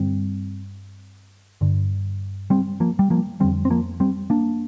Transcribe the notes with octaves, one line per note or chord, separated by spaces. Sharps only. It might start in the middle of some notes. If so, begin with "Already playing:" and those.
Already playing: G2 D3 G3 C4
G2 D3
G3 C4
F3 A#3
G3
F3 A#3
F2 D3 G3 C4
C4
F3 A#3
G3 C4
A#3 D4